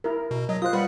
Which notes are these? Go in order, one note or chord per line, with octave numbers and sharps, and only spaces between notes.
E4 A#4
B2
F#3 D#5
F4 C5 D#6 F#6
G3 B4 F#5